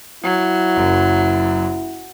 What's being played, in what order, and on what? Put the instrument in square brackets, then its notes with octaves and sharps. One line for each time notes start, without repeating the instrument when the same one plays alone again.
[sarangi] F#3 [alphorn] E4
[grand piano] F#1 F#2